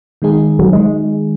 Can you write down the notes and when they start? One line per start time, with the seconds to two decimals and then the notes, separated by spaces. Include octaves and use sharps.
0.22 D#3 G#3 D#4 G#4
0.59 F#3
0.73 G#3